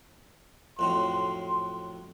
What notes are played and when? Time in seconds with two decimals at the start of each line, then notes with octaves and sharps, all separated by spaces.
0.79 F2 A2 F#3 C6